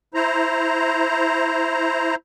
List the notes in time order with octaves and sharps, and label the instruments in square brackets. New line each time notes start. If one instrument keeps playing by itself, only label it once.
[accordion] E4 C5 A#5